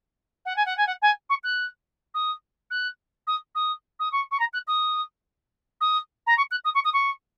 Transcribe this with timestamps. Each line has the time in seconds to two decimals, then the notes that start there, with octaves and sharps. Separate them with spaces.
0.45 F#5
0.56 G#5
0.65 F#5
0.77 G#5
0.87 F#5
1.02 G#5
1.29 C#6
1.43 F#6
2.14 D#6
2.70 F#6
3.27 D#6
3.55 D#6
3.99 D#6
4.12 C#6
4.31 C#6
4.39 A#5
4.53 F#6
4.67 D#6
5.81 D#6
6.26 A#5
6.37 C#6
6.51 F#6
6.64 D#6
6.74 C#6
6.84 D#6
6.93 C#6